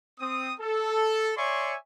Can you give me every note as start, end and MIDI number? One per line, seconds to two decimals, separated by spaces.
0.20 0.53 60
0.20 0.53 87
0.60 1.31 69
1.37 1.75 73
1.37 1.75 74
1.37 1.75 76
1.37 1.75 80
1.37 1.75 84
1.37 1.75 85